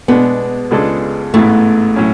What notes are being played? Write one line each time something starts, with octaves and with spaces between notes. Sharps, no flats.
B2 G#3 B3 D4
C#2 C#3 G#3 D4 A4
A1 G#2 E3 A3 B3
A2 F#3 C#4